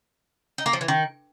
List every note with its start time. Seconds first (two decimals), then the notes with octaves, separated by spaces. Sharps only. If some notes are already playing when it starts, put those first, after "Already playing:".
0.58 D#4
0.66 A#3
0.73 F3
0.81 E3
0.88 D#3